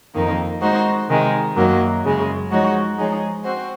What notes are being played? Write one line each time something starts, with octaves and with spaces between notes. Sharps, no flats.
F2 D#3 A#3 D#4
G#3 D#4 F#4 C5
C3 D#3 G#3
F#2 D#3 F#3 A#3
F#2 C#3 G#3
F3 G#3 D#4 F#4 C#5
F3 G#3 D#4 G#4 C#5
C4 F#4 C5